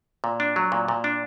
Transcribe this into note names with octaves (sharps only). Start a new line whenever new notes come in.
A#2
D4
F#3
A#2
A#2
D4